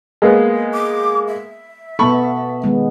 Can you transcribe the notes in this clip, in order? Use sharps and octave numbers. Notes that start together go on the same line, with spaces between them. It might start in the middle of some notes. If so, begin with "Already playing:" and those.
G#3 A#3 B3
D6
E5
B2 B3 A4 A5 B5 C#6
D#3 G#3 B3